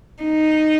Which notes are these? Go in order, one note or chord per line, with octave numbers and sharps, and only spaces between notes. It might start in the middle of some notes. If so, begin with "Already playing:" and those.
D#4